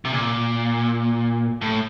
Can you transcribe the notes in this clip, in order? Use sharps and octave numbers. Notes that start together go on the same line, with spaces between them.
C3
A#2
A2